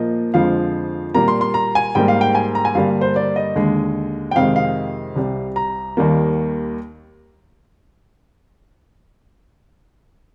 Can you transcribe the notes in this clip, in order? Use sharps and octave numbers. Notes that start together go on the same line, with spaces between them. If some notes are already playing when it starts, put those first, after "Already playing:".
Already playing: A#2 F3 A#3 D#5
F2 D3 F3 G#3 F5
A#2 G3 A#3 A#5
C6
C6
A#5
G#5
G#2 G3 A#3 G5
F5
G5
G#5
A#5
G#5
G2 D3 G3 A#3 F5
C5
D5
D#5
D#2 D3 G#3
G5
F2 C3 D#3 G#3 F5
F5
C2 C3 G3
A#5
D#2 D#3 G3 A#3